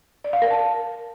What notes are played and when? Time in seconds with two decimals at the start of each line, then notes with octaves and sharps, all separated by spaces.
0.24 D5
0.33 F5
0.42 A#4
0.51 A5